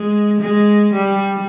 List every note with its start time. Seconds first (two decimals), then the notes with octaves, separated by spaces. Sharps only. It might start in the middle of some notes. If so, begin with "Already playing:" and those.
Already playing: G#3
0.41 G#3
0.93 G3